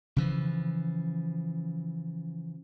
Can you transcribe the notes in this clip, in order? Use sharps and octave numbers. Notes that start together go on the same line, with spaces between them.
C#3 E3 F3